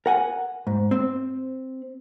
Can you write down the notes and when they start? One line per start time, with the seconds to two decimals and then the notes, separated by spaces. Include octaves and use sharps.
0.06 A#4 F#5 G#5
0.67 G#2
0.91 C4